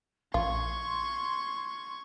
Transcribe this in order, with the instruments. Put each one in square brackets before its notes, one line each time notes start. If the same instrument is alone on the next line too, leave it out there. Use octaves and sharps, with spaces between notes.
[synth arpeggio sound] A#1 [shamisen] F4 [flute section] C6 [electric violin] C#6 G#6